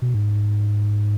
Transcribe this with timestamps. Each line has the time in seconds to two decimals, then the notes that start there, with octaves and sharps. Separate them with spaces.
0.02 B2
0.14 G#2